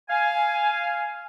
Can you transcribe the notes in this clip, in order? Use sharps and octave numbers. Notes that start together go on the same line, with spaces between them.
F5 G#5